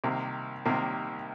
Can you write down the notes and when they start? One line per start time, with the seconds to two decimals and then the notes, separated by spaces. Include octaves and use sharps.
0.04 C2 C3 D#3 A#3
0.65 C2 C3 D#3 A#3